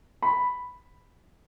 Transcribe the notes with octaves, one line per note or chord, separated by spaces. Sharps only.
B5